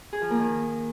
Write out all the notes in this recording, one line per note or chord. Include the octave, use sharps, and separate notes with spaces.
G#4
F3
A#3
D#3